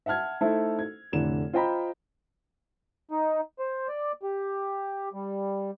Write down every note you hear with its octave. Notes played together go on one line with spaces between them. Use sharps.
E5 F#5 A5 F6 G#6
A3 D#4 E4 A4 C5
G#6
F1 A2 D3 E7
F4 C5 D#5 G5 A#5 B5
D#4
C5
D5
G4
G3